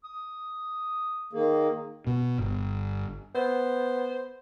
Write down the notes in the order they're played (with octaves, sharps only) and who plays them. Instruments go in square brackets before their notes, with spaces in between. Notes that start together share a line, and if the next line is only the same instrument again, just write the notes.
[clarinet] D#6
[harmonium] D#3 A#3 [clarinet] G#4
[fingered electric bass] B2
G1
[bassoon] B3 [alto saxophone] C5